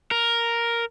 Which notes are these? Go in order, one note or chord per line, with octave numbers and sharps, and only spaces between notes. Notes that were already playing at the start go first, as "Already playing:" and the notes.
A#4